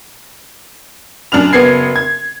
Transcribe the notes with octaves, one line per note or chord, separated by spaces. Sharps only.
F#2 D4 F6 F7
F#1 B3 G#6 C7
G#6